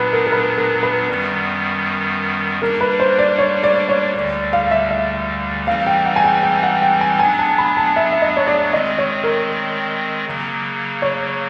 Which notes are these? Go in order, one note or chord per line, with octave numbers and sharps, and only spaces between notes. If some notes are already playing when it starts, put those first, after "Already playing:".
Already playing: A#2 F#3 B3 D4 B4
A#4
A#4
B4
A#4
B4
F#2 D#3 G3 B3
G3 A#3 D4 A#4
B4
C5
D5
C#5
D5
C#5
D2 D3 G3 D5
F5
E5
E5
E3 G3 C4 D#4 F5
G5
F#5
G#5
G5
G5
F#5
G5
G#5
F#3 B3 D4 G#5
A5
B5
A5
E5
E5
D#5
C#5
D5
D#3 G#3 C4 D#5
C#5
A#4
C#3 F#3 A#3
C#5